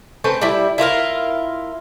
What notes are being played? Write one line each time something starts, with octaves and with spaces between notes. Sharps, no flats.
A3 C4 C#4 B4
G3 E4
E4 F4 A#4 F5